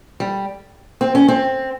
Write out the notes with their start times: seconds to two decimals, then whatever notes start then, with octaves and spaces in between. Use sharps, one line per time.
0.20 G3
1.01 C4
1.15 C#4
1.28 C4